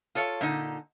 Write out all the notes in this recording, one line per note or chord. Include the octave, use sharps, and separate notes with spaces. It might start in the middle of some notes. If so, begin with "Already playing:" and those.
F4 A4 C#5 F5
A#2 D3 D#4